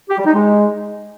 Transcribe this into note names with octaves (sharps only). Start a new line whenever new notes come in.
G4
G3
D#4
G#3